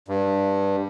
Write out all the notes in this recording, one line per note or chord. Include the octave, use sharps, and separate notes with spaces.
G2